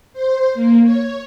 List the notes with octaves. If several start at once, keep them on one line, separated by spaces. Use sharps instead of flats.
C5
A#3
C#5